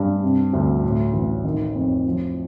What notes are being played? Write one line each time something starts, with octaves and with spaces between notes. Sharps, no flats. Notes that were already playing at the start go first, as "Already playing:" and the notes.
Already playing: G2
C3
D2
A2
A1
D#3
F2
F3